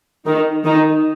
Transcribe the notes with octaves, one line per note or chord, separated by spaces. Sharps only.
D#3 D#4
D#3 D#4